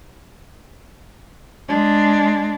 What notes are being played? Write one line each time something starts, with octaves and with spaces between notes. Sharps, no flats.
G#3 D4